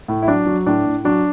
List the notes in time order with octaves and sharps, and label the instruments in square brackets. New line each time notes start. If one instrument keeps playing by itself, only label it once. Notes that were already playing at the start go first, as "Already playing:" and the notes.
[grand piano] A2
E4
F#3 D4
F#3
A2 D4
A2
F#3 D4